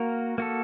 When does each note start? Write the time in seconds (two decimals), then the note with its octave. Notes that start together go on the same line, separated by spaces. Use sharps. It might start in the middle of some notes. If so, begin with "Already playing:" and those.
Already playing: A#3 F#4 A#4
0.38 A#3 F#4 A4